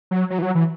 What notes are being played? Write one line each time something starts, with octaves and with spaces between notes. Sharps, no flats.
F#3
F#3
E3
F#3
E3